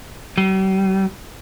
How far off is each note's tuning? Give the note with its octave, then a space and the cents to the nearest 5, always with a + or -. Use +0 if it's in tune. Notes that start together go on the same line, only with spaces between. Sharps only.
G3 -45